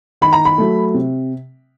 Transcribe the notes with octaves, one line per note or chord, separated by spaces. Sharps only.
D#3 B5
A#5
B5
F#3 A3
C3